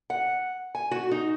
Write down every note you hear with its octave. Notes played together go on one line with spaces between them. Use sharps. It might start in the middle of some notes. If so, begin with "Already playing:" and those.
F#5
G#5
F#4
D#4